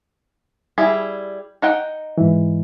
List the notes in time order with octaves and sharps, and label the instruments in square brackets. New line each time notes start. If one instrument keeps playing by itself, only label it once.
[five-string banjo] G3 E4 G#4
D#4 F#5 G5
[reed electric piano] G#2 E3